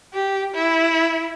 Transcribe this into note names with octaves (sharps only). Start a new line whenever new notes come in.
G4
E4